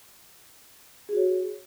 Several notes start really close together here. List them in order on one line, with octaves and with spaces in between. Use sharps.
G#4 F#4 C#5